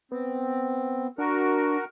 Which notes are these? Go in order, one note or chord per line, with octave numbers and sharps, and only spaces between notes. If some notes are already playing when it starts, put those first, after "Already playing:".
B3 C4
D4 F#4 A#4